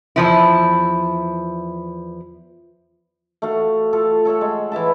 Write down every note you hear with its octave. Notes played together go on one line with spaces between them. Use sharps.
E2 F3 E4
A3 F#4 F5 F#5
F4 A4 F5
A4 C#5 E5 F#5
G#3
E3 B4 E5 A5